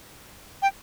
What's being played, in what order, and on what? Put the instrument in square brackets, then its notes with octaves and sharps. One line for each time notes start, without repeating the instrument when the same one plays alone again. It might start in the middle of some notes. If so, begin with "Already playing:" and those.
[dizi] G5